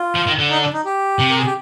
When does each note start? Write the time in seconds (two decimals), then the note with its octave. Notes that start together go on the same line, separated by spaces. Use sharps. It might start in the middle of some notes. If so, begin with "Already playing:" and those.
Already playing: F4
0.15 F3
0.27 D#3
0.39 D3
0.50 D#4
0.61 D4
0.73 D#4
0.85 G4
1.19 C3
1.30 A#4
1.38 G#4
1.46 G4